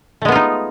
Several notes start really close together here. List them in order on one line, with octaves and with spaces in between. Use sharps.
A3 G#3 B3 F4 D#4